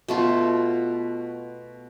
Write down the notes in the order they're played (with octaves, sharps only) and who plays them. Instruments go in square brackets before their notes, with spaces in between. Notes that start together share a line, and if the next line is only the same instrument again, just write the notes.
[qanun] B2 A3 F4 A4